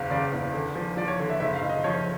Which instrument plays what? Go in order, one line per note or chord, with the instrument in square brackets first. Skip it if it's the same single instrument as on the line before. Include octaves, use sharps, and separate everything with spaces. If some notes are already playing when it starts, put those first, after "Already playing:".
Already playing: [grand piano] F#1 E2 F5
C#3 D5
E2
D3
F3
F3 D5
C#5
D3
E5
F#1 E5
F5
F#1
D#5
F3 C#5